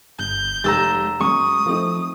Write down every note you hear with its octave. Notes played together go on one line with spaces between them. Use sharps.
G1 G6
F1 G#3 G4 A#5 E6 A6
F#2 G#3 C#6 D#6
F3 A3 C4 D#4